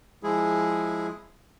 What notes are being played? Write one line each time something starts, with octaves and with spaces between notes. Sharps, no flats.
F3 G#3 E4 G#4